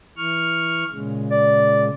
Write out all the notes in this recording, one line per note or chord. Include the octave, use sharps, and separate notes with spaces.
E3 C#6 F6
A#2 C#3 G#3
D5